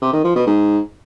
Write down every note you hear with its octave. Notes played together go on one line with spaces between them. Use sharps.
C3
D#3
F3
B2
G#2